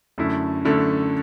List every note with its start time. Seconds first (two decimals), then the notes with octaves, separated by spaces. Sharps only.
0.18 F#2 D3 A3 E4
0.65 F#2 D3 A3 E4